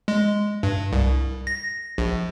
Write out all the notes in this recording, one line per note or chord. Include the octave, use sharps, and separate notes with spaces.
G#3
G2
C2
A#6
A#1